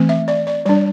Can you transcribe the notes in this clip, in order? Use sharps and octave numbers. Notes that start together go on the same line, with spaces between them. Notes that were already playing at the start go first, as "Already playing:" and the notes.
Already playing: E3 A3 C4
E5
D5
D5
G3 D4 D5